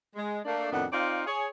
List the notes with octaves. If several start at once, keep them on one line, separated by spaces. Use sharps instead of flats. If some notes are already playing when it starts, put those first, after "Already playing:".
G#3
A3 A#3 D4
F2 A2 D#3 B3 D4 F#5
C4 D#4 F4 D5 F5
G#4 C#5